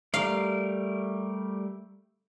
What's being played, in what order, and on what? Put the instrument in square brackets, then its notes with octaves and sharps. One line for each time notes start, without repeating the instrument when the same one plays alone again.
[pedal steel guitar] G3 A3 A#4 [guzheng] F5